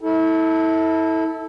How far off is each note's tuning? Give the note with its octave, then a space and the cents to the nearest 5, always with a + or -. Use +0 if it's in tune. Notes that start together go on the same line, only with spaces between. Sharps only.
E4 -30 A4 +0